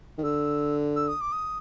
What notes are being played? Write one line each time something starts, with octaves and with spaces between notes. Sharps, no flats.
D#3
D3 E6
E6
D#6
D6
D#6